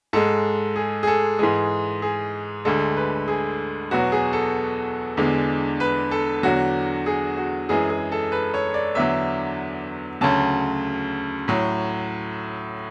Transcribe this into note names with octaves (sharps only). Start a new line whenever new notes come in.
G#2 G#3 A4
G#4
G#4
A4
G#2 E3 G#3 G#4
G#4
D2 D3 G#3 A4
B4
G#4
E2 B2 F#3 F#4
G#4
A4
E2 D3 G#3
B4
A4
E2 D3 F#3 F#4
G#4
F#4
F#2 E3 G#3 G#4
G#4
A4
B4
C#5
D5
E2 D3 F#3 E5
D2 C#3 F#3 A5
A2 F#3